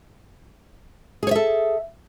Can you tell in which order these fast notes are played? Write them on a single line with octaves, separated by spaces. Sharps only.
G#4 C#5 E5 A4